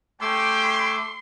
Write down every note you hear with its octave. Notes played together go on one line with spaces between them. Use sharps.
A3 C#4 G4 G5 C6 D6 E6